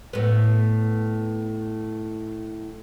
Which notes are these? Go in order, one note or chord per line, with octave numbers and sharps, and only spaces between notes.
A2 B3